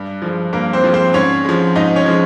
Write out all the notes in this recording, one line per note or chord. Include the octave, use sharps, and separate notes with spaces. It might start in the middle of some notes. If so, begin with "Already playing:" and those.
Already playing: G2
F3 G#3
G2 A#3 A#4
C4 C5
F3 G#3
C4 C5
G#2 C#4 C#5
F3 G#3
G#2 D#4 D#5
C#4 C#5
F3 G#3